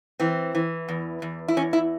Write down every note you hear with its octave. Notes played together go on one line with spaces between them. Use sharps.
E3 C4
E3
E2
E2
E4
E2 C#4
E4